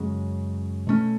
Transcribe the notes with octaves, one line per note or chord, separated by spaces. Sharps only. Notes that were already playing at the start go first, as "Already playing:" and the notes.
Already playing: F#2 C#3 G#3
B2 A3 C#4